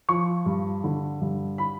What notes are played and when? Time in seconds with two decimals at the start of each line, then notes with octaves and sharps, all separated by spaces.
0.09 F3 C#6
0.46 G2
0.84 D3
1.21 G2
1.58 B5